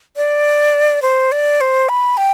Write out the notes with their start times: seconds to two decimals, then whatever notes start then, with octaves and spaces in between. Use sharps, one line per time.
0.16 D5
1.02 C5
1.32 D5
1.61 C5
1.89 B5
2.17 G5